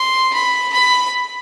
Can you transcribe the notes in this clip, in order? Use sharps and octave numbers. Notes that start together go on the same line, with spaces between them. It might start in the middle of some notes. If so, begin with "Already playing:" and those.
Already playing: C6
B5
B5